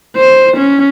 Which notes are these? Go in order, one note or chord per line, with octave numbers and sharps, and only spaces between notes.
C5
C#4